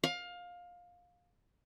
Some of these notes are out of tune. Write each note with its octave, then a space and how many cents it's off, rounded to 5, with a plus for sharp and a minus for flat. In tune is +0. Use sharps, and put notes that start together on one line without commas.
F5 +20